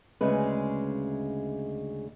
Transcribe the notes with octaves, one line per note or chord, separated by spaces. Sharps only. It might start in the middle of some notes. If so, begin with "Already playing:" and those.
D2 C#3 G#3 B4